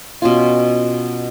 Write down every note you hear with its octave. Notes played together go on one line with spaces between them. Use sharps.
B2 C#4 F4